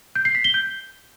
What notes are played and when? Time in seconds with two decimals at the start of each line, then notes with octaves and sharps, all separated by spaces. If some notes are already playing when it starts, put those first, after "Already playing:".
0.15 G6
0.25 C7
0.35 B6
0.44 G7
0.54 G6